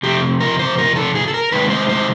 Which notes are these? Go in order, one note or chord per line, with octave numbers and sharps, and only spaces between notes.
F2 C3 G4
A#4
C5
A#4
A4
G#4
A4
A#4
C3 D#3 G#3 B4
C5
C5